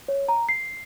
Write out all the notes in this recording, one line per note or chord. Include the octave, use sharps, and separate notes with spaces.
C#5
A#5
C7